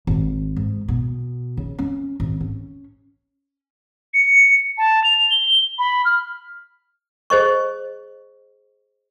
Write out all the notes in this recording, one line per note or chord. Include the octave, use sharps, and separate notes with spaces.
G#1
G#2
B2
C#3
C#4
G#1
C#4
C#7
A5
F7
G7
B5
F6
G#4 C5 D#5 C#6